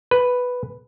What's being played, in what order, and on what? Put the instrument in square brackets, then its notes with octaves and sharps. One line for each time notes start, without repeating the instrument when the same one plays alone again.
[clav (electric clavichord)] B4